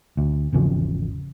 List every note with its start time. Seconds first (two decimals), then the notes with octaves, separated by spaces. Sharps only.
0.17 D2
0.53 G#1 E2 C#3 F3